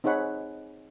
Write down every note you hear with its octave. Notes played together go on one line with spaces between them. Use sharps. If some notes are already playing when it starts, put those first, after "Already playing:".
C4 D#4 G#4 C#5 F#5 B5